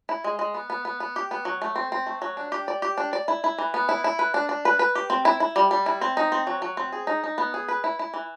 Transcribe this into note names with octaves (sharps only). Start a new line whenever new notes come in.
E4
G#3
G#3
B3
B3
B3
B3
G4
B3
F#3
A3
C4
C4
A3
F#3
D4
G4
D5
G4
D4
D5
E4
E4
E3
B3
E4
E4
B4
D4
D4
B4
B4
G4
C4
E4
E4
G3
G3
E4
C4
D#4
C4
F#3
F#3
C4
G#4
D#4
D#4
B3
G#4
B4
E4
E4
E3